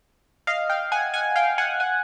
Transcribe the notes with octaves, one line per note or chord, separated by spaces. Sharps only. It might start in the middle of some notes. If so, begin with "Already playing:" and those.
D#5 F5
F5 G5
F#5 G#5
F#5 G#5
F5 G5
F#5 G#5
F#5 G#5